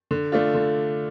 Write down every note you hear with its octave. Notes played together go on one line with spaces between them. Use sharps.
D3
A3 D4 F4
D3